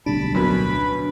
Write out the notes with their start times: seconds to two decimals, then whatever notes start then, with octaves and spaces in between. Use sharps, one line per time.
0.06 D1 B1 G3 D4 A5 B5
0.35 F#2 B2 B4 B5